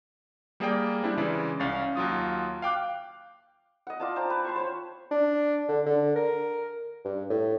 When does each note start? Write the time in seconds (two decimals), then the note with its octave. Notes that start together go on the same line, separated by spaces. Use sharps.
0.60 G3 A#3 G#4 A#4 D5 G5
1.03 G3 C4 D4 E4
1.17 C#3 E3 G#3 D5
1.60 C2 C#4 F5 C#6 A6
1.96 D#2 F#3 F4 D#6
2.62 F5 G5 D6 F#6
3.87 D#5 F#5
4.00 F4 D5 A5
4.16 C5 G5 A5 A#5
4.30 B4
4.45 A5 C6 C#6
4.56 C5 C#5 B5
5.11 D4
5.69 D3
5.86 D3
6.16 A#4
7.05 G2
7.30 A2